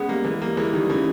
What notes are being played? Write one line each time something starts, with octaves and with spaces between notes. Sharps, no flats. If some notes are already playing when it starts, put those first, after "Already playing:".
Already playing: C#3 G#3 B3
G3 A#3
E3 G#3
G3 A#3
E3 G#3
D#3 G3
C#3 E3